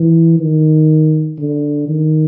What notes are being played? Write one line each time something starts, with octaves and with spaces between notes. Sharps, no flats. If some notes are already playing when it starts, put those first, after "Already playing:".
Already playing: E3
D#3
D3
D#3